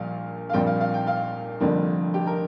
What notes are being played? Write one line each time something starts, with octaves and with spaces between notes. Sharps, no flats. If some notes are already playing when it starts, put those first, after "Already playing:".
Already playing: A#1 A#2 G3 F5
F5
A#1 A#2 G3 C4 G5
F5
F5
G5
F5
F1 F2 D3 G3 A#3
G4
A#4